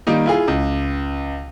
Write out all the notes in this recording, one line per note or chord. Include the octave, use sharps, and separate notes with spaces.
D#3 G3 A#3 D#4
E4 F4 G#4
C#2